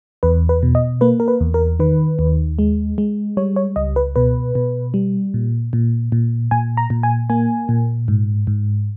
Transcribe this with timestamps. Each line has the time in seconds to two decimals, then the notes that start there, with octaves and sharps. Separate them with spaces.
0.23 E2 B4
0.49 B4
0.63 B2
0.75 D#5
1.01 A#3 B4
1.20 A#4
1.28 B4
1.41 E2
1.54 A#4
1.80 D#3 B4
2.19 D#2
2.59 G#3
2.98 G#3
3.37 G3 C#5
3.56 C#5
3.76 C#2 D#5
3.96 B4
4.16 B2 B4
4.55 B2
4.94 G3
5.34 A#2
5.73 A#2
6.12 A#2
6.51 A#2 G#5
6.77 A#5
6.90 A#2
7.03 G#5
7.30 A#3 G#5
7.69 A#2
8.08 G#2
8.47 G#2